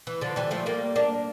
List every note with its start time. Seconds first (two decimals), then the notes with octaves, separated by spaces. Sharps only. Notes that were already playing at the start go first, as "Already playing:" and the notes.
0.07 E3
0.21 D3 F3
0.36 E3 G3
0.51 F3 A3
0.66 G3 A#3
0.96 A#3 D4